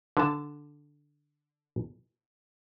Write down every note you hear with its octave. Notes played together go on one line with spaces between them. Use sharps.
D3 A5